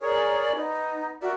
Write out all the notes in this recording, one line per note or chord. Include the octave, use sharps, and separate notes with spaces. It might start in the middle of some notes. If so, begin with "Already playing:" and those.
G#4 A#4 C#5 D5
B3 D#4
F#4 A#4 D5 E5